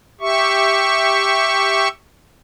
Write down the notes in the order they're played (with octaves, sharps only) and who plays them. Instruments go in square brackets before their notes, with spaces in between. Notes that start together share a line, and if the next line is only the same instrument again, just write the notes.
[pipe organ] G4 E5 C#6